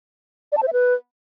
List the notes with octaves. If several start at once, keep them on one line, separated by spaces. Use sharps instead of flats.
D5
A5
C5
E5
B4